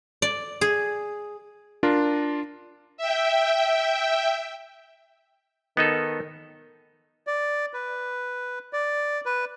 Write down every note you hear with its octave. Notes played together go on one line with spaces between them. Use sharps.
D5
G#4
D4 F4 A#4
E5 G5
D#3 B3 D#4 A4
D5
B4
D5
B4